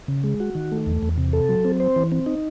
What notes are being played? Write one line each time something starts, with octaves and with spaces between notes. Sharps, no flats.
C#3
G#3
F#4
D#3
A3
E2
E2
C3
A4
F#3
C4
C5
E3
C4
D#4